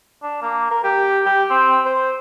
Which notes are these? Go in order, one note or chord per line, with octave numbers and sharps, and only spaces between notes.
D4
A#3
A#4
G4
G4
C4
C5